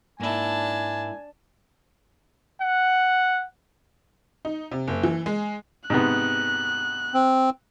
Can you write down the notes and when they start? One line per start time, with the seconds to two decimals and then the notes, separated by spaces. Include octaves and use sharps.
0.20 G#2 A#3 D4 E4 G#5 A5
2.61 F#5
4.45 D#4
4.71 C3
4.88 F#1
5.03 E3
5.26 G#3
5.90 G#2 C3 B3 F#6
7.14 C4